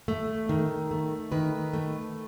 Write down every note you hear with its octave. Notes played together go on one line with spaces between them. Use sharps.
A3
D#3
A3
D#3 B4
A3